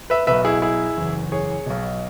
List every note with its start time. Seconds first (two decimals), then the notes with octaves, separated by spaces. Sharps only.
0.10 B4 E5
0.27 B1 B2 B4 E5
0.45 E4 G#4
0.62 E4 G#4
0.97 F#1 E2 E3
1.32 G#4 C#5
1.66 B1 B2